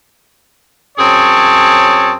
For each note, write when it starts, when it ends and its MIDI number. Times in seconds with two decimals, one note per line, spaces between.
0.98 2.13 42
0.98 2.13 60
0.98 2.13 68
0.98 2.13 73
0.98 2.13 81